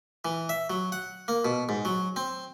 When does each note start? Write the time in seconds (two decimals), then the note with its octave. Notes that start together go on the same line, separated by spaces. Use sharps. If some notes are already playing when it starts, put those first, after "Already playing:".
0.25 E3
0.49 E5
0.70 F#3
0.92 F#5
1.28 A#3
1.45 B2
1.69 G#2
1.85 F#3
2.16 C4